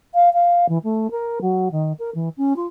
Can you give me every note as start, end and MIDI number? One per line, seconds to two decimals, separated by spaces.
0.14 0.29 77
0.33 0.66 77
0.69 0.78 52
0.84 1.10 57
1.11 1.39 70
1.41 1.68 54
1.71 1.93 51
1.99 2.10 70
2.15 2.29 52
2.37 2.56 61
2.56 2.66 65